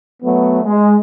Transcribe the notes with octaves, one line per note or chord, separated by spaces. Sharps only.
F#3 A3 B3
G#3